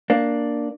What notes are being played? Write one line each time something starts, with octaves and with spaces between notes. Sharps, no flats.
A#3 D4